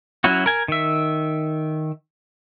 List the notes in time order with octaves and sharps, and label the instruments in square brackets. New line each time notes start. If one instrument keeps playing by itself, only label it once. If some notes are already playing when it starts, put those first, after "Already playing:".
[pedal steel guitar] F#3 C#4 E4 F#4
A#4 G#5
D#3 E5